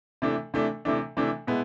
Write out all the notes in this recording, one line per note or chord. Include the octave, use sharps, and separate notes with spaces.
C3 E3 A3 D4
C3 E3 A3 D4
C3 E3 A3 D4
C3 E3 A3 D4
B2 G#3 B3 E4